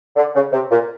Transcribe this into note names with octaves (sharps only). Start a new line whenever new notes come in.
D3
C#3
C3
A#2